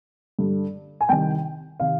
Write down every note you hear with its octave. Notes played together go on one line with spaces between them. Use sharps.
G2 D3
G#5
C2 C3 D#3 G5
C3 D#3 F5